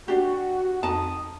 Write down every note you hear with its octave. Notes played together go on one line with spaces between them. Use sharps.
D4 F#4 G4
F2 D#4 A5 D#6